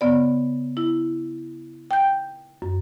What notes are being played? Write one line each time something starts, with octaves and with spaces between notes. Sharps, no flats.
C#3 B3 D5
E4
G5 G6
F#2